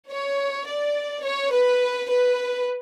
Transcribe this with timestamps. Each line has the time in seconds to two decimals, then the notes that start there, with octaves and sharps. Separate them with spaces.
0.10 C#5
0.66 D5
1.23 C#5
1.52 B4
2.09 B4